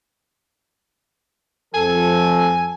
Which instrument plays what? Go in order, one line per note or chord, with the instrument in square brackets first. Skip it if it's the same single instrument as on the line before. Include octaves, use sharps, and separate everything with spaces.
[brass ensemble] F2 F3 A4 [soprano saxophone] G#5